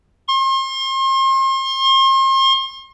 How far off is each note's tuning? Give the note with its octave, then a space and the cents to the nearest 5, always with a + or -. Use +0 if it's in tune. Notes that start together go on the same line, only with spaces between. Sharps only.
C6 +40